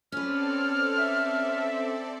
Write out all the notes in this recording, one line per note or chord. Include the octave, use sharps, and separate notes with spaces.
C4 C#4 A4 B4 D5 F6
E5